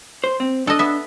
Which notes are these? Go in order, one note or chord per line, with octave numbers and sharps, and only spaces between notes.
C5
C4
D4 A4 D#5
B3 E5